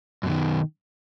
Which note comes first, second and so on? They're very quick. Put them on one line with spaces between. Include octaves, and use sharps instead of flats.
F#2 B2 D#3